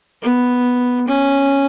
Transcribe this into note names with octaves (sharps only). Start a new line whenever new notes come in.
B3
C#4